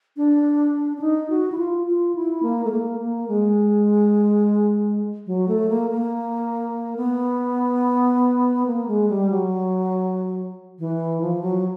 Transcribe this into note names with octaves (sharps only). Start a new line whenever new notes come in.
D4
D4
D#4
F#4
E4
F4
F4
E4
A#3
A3
A#3
A#3
G#3
F#3
A3
A#3
A#3
B3
A#3
G#3
G3
F#3
E3
F3
F#3